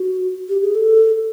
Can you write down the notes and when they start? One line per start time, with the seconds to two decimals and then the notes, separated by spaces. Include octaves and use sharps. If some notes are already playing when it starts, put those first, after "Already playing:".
Already playing: F#4
0.49 G4
0.63 G#4
0.75 A4